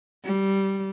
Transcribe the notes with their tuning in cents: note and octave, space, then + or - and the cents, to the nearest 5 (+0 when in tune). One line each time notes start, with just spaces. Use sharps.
G3 -10